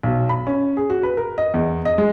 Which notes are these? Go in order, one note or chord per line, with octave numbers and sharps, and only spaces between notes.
B1
B5
C#4
G#4
F#4
B4
A#4
D#5
E2
D#5
G#3